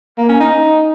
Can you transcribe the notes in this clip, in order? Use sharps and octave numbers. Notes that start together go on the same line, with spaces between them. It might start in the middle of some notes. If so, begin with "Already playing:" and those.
A#3
C#4
D#4